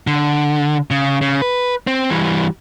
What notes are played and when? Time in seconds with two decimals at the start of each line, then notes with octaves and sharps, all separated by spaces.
0.07 D3
0.91 C#3
1.21 C#3
1.42 B4
1.87 C4
2.10 E3 G3